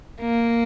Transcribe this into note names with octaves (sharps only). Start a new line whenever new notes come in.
A#3